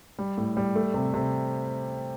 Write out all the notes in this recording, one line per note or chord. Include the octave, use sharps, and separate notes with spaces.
G3
A2
G3
A3
C3
C3